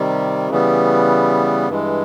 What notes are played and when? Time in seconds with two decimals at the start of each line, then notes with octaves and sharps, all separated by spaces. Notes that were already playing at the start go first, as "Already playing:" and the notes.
Already playing: C3 D#3 G3
0.50 C#3 E3 G3 B3
1.68 G2 E3 G#3